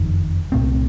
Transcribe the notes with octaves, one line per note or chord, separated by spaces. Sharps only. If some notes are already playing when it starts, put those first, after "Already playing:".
Already playing: F#1 F2 D#3
C2 A#2 A3 C4